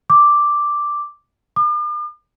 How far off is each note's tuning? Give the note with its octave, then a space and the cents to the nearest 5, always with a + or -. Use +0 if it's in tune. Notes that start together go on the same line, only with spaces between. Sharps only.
D6 +0
D6 +45